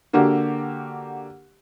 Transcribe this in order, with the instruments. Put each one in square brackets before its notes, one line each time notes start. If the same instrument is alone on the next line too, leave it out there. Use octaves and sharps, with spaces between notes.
[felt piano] D3 A#3 F#4 G4